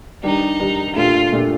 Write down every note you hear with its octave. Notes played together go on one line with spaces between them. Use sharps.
D#3 G3 D4 D#4 G4
D#3 G3 D4 G4
A#2 A3 D4 F4 G4
A#2 A3 D4 G4